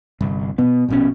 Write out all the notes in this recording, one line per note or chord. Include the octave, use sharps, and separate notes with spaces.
G1 C2
B2 B3
A#1 B2 C#4